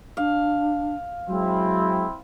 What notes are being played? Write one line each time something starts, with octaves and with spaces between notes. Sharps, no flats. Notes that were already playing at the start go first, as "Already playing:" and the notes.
D4 F5
F#3 G#3 C4 E4